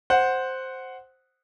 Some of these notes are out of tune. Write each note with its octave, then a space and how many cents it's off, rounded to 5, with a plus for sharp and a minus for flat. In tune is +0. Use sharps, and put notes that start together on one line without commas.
C5 +0 F#5 +0